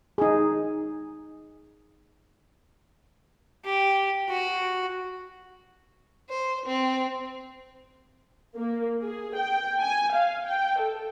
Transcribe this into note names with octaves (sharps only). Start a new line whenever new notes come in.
D#4 G#4
G4
F#4
C5
C4
A#3
G#4
G5
G#5
F5
G5
A4